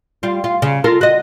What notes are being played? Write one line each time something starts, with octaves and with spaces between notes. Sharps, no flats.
G3 F4
F4
C#3
F4 A4 A#4
F#4 D#5